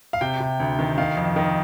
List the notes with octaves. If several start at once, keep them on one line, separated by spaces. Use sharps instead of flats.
F5
C3 G5
C3
D2
D#3
D#3 F5
F2
D#3